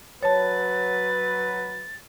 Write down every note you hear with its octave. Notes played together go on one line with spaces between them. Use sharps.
F#3 B4 C#5 A5 A6